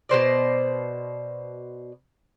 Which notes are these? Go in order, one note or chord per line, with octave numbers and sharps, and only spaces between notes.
B2 G3 C5 D5